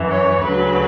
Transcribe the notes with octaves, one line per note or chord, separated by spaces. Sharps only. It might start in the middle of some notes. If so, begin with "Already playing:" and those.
Already playing: F#2 E3
C#5
D2 C#3 F#3 B4